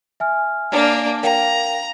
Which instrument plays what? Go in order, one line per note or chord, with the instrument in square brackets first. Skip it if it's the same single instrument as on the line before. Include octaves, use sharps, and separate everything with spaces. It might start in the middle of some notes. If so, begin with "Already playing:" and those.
[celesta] E5 G#5 F6
[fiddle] A#3 D4
[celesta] A#4 F5 G5 [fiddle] A#5